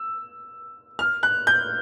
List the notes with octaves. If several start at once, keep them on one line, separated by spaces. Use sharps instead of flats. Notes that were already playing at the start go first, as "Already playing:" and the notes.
Already playing: E6
F6
F#6
G6